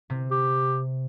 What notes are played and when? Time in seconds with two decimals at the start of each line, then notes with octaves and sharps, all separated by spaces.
0.10 C3
0.31 G4